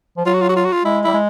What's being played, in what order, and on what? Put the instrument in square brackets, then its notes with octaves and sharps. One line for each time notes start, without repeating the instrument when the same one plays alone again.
[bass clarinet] F3
[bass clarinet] F#3 [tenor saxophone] F4
[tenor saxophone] F#4
F4
F#4
F4
F#4
F4
[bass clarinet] G#3 [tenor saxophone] E4
[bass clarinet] G3 [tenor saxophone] E4
[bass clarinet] G#3